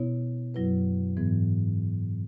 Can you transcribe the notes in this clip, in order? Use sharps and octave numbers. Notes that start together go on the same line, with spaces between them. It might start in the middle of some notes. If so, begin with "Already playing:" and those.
Already playing: B2 B3 E4 C#5
F#2 F#3 E4 B4
G#2 E3 B3